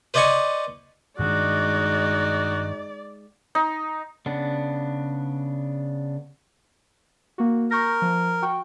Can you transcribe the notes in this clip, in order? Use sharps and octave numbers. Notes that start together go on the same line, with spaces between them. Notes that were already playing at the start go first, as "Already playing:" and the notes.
B4 C5 D5 D#5 G#5 C#6
G2 D#3 G#3 D4 D#4 F#4 D5
D#4
C#3 B3 D4
A#3 F#4
A#4 C#6 G6 A#6
F3
F#4 G5 C#6